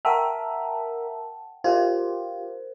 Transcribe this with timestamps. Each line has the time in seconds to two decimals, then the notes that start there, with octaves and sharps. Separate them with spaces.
0.05 A#4 E5 F#5 G5 A5
1.64 F4 G4 A#4 C5